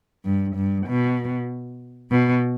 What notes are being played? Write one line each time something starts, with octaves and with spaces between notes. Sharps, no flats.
G2
G2
B2
B2